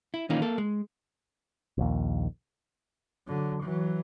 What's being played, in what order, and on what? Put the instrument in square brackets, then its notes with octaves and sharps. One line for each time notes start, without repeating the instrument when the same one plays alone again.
[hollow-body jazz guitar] E4
D#3 E3 A#3 C#4 D#4 F4
A#3 A4
G#3
[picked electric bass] A#1 D#2
[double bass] D3 F#3
E3 F#3